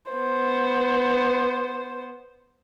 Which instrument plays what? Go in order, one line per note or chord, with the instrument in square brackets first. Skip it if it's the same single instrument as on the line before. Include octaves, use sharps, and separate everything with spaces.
[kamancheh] B3 C5